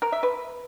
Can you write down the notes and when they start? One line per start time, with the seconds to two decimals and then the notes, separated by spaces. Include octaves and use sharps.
0.02 A#4
0.12 E5
0.23 B4